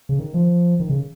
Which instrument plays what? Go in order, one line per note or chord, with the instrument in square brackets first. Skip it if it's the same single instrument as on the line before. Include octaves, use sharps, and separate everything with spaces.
[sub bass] C#3
D#3
F3
D#3
C#3